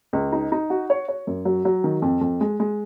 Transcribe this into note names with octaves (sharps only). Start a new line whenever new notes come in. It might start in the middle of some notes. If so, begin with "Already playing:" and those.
C#2
D#4
D#4
F#4
C#5
C#5
F#2
F#3
F#3
D#3
F2
F2
G#3
G#3